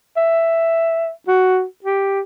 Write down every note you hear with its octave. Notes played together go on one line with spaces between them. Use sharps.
E5
F#4
G4